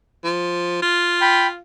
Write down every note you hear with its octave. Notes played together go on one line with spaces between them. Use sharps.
F3
F4
G5 B5